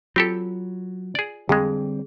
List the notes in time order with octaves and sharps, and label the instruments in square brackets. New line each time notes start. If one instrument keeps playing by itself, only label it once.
[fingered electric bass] F#3 [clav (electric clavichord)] C4 G4 A4 [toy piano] F4
[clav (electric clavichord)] G#4 D5
[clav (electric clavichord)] F2 G#3 [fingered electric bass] D3 G3 C4 [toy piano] G#4